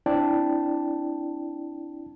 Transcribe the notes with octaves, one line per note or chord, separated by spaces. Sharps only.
C4 D4 E4 D5 G5 A5